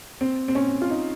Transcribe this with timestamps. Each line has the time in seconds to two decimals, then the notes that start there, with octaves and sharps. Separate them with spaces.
0.21 C4
0.48 C4
0.55 C#4
0.81 F4
0.90 D#4